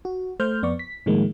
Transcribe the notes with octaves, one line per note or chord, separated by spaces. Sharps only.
F#4
A3 C5 F6 G6
F2 B3 D5 C#6
B6
A2 D#3 F3 G#3 A#3